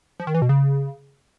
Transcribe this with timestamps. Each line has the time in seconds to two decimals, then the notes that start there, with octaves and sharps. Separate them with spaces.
0.20 F3
0.27 D#3
0.34 E3
0.42 B2
0.49 C#3